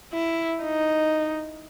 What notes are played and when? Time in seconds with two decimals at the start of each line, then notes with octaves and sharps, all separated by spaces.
0.13 E4
0.62 D#4